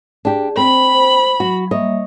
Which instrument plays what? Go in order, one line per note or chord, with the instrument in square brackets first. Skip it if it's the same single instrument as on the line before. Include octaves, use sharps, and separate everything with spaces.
[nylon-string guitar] D4 G4 [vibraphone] G#4
[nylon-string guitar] C4 [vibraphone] C5 [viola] B5
[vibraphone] C5
[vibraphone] F#3 [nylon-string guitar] F#4
[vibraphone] G3 A#3 E5 [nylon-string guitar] C#5 D#5